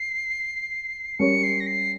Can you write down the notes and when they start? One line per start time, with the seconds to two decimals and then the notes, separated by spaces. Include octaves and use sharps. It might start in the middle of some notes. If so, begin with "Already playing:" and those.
Already playing: C7
1.19 G3 C#4 G4 A#4 C#5 C#7
1.43 C7
1.60 A#6
1.67 C7